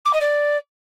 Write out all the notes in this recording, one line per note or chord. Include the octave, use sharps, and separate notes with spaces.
D6
D#5
D5